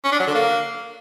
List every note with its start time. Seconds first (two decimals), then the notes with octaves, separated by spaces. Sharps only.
0.04 C#4
0.12 D4
0.19 F#3
0.27 D3
0.35 A#3